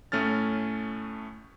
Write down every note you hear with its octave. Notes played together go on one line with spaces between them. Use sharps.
A2 A3 C#4 F6 A6